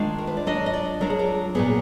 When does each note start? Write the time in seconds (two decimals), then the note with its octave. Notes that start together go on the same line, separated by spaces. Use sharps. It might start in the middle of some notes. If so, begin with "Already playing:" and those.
Already playing: D#3 G#3 D4 F4 F5
0.18 A#4
0.27 B4
0.37 D5
0.47 F#3 D4 F4 D#5
0.66 D#5
0.74 D5
1.01 F#3 D4 F4 A#4
1.10 G#4
1.19 A#4
1.55 A#2 F#3 B3 G#4